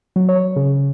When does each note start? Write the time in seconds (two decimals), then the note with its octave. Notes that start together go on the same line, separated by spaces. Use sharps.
0.16 F#3
0.29 C#5
0.56 C#3